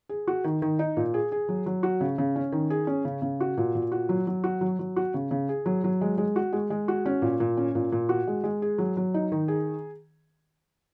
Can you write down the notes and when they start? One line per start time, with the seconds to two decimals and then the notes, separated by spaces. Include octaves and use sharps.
0.09 G#4
0.28 F#4
0.44 D#3
0.62 D#3
0.79 D#4
0.97 A#2
1.14 G#4
1.32 G#4
1.49 F#3
1.66 F#3
1.83 F#4
2.01 C#3
2.18 C#3
2.36 C#4
2.52 D#3
2.70 G#4
2.87 C#4
3.05 C#3
3.22 C#3
3.41 F#4
3.57 A#2
3.75 A#2
3.92 F#4
4.09 F#3
4.27 F#3
4.44 F#4
4.61 F#3
4.79 F#3
4.96 F#4
5.14 C#3
5.31 C#3
5.49 G#4
5.66 F#3
5.84 F#3
6.01 G#3
6.18 G#3
6.36 F#4
6.53 G#3
6.70 G#3
6.88 F#4
7.06 C#4
7.22 A#2
7.40 A#2
7.57 C#4
7.75 A#2
7.92 A#2
8.09 F#4
8.27 G#3
8.44 G#3
8.62 G#4
8.78 F#3
8.97 F#3
9.14 D#4
9.32 D#3
9.48 G#4